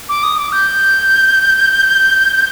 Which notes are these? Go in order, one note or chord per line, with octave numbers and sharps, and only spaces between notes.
D6
D#6
D6
G6